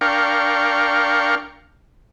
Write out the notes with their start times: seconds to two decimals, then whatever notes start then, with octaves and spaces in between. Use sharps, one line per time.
0.01 D4 A#4 F5 G5 C#6